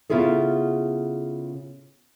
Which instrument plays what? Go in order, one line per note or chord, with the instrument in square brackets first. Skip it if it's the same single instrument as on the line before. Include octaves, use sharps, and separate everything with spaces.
[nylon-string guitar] C#3 B3 E4 F4 G#4 A4